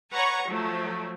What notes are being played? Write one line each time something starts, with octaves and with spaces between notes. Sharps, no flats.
B4 C#5 F#5 A#5 C#6
F3 F#3 A3